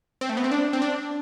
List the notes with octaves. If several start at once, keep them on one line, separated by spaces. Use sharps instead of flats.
C4
A3
B3
C4
D4
C4
D4